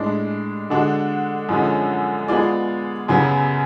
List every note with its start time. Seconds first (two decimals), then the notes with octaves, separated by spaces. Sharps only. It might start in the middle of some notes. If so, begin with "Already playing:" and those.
Already playing: A2 G#3 D4
0.70 D3 G#3 D4 F#4
1.49 F#2 D3 F3 G#3 C#4
2.28 G#3 B3 F4 G#4 D5
3.08 F#2 C#3 F#3 B3